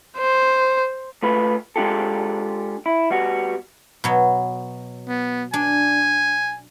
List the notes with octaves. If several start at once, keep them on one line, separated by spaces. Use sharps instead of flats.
C5
A3 F4 B4
G#3 D4 F4 G4 A4
E4
G3 B3 F#4
B2 F#3
B3
D4 G#5